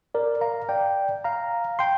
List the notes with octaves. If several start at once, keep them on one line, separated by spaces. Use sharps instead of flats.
A#4 D5
F5 A#5
D5 G5
F5 A#5
G5 C6